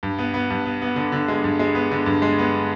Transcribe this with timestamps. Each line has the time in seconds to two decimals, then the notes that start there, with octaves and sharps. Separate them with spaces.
0.03 G2
0.18 B3
0.34 B3
0.50 G2
0.65 B3
0.82 B3
0.96 D3
1.12 D3
1.28 G#3
1.44 G2
1.59 G#3
1.75 B3
1.92 D3
2.06 G2
2.22 G#3
2.39 B3